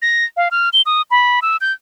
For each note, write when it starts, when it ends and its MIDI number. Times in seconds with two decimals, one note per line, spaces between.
0.02 0.25 94
0.37 0.49 77
0.51 0.69 89
0.73 0.82 103
0.86 1.02 87
1.11 1.40 83
1.42 1.57 88
1.61 1.72 91